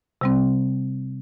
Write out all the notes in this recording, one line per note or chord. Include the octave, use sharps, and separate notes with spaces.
C3 G3 C4